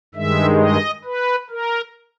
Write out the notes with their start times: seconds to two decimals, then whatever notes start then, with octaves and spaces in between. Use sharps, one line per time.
0.14 G2 D#3 G#3 E5
0.60 D#5
1.04 B4
1.50 A#4